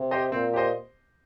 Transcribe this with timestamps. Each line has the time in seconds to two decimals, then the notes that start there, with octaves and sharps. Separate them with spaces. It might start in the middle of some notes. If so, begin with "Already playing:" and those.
Already playing: C3
0.11 G4 C5 D#5
0.32 A#2 C4
0.53 G4 C5 D#5